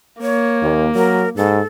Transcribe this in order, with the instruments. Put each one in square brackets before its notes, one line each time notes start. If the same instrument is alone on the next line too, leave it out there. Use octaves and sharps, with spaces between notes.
[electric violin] A#3 [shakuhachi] C#5
[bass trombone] D#2
[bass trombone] F#3 [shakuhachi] A#4
[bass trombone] G#2 [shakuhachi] A4